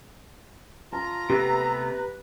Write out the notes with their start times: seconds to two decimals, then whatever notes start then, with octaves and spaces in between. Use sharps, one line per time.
0.93 F4 A5 A#5
1.30 C3 A3 B3 G4 B4